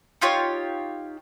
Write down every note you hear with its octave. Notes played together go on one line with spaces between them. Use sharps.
D#4 F4 G4 C#5